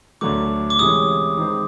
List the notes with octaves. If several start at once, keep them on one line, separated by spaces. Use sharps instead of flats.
D2 D3 F#3 A3 D6
D6
C3 E3 G#3 C#4 D#6
D#3 G#3 C4